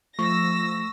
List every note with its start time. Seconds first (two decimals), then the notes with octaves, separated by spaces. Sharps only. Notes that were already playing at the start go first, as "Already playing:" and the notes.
0.19 F3 A3 C#6 E6 A#6